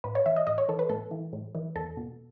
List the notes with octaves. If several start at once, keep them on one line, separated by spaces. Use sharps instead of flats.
A2 B4
C#5
E3 E5
D#5
A2 D#5
C#5
E3 A4
B4
A2 A4
E3
A2
E3
E2 A4
B2